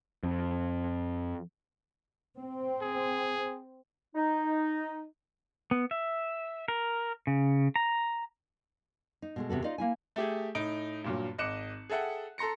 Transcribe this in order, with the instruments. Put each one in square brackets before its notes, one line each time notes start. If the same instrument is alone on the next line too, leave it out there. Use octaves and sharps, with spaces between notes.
[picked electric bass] F2
[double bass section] C4
[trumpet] G#4
[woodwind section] D#4
[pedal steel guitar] B3
E5
A#4
C#3
A#5
[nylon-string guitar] D#4
B2 G#3 A3
E2 C3 B3 F#4 A4
D#4 F4 D5 D#5 F5
A#3 E4 G#5
[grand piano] A3 G4 G#4
A2 D#4 D7
G2 A#2 F#3
G#1 D#5 D6 F#6 C#7 E7
G#4 A4 E5 F#5 G5
A4 A#5 C6 A#6 C#7